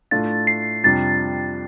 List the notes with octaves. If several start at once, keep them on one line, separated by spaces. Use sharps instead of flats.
A2 A3 D4 F4 A6
C7
F2 C3 G3 D4 A6